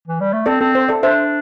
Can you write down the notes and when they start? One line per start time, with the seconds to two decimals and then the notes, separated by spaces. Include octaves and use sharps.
0.08 E3
0.21 G3
0.33 A3
0.46 C4 A4 D5
0.61 C4 A4
0.75 C5
0.89 A4 D5
1.03 D4 C5 E5